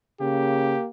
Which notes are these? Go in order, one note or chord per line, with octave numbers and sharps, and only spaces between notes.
C#3 A#3 G4